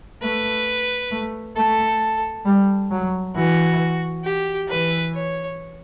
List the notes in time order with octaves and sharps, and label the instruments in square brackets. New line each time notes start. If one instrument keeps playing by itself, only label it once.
[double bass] A3 [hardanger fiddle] B4
[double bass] A3
[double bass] A3 [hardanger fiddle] A4
[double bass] G3
F#3
[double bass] E3 [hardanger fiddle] F#4
[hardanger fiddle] G4
[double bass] E3 [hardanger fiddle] B4
[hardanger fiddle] C#5